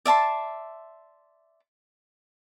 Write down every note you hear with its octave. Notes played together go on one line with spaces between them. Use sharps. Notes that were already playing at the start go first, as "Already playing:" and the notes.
D5 E5 A5 C6